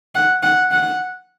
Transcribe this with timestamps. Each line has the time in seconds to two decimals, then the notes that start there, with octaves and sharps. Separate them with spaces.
0.15 F#5
0.43 F#5
0.71 F#5